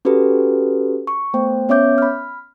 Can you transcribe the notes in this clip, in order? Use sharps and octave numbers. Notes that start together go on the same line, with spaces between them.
C#4 F#4 G4 A4 B4
C#6
A3 B3 C5 G5
B3 C#4 C#5 E5 D6 G6
B5 F6